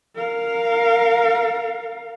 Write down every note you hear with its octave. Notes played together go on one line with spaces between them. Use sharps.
A#4 F5